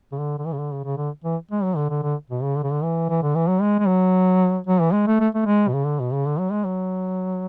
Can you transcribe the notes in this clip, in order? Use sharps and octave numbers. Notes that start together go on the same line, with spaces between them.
C#3
D3
D3
E3
C#3
D3
C#3
C#3
D3
E3
G#3
F#3
D3
D3
D3
B2
C#3
D3
C#3
D3
E3
E3
D3
E3
F#3
G#3
G#3
F#3
F#3
E3
G#3
A3
A3
A3
G#3
B2
C#3
D3
B2
C#3
D3
F#3
G#3
F#3